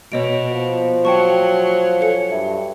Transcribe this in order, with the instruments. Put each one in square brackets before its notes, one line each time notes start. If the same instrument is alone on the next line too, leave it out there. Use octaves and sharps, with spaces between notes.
[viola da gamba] B2 [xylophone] C#5 D#5 D7
[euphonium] F3
[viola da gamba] F#3 [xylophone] G5 A5 C#6
[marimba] A4 F5 G#5 [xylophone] C#5 C#7
[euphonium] G2 [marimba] E5